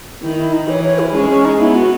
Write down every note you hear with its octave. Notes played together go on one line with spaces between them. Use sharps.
D#3 E4
E4
D#4
E3 C#5
C#5
E4
G#3 C#4
C#4
D#4
B3 E4
F#4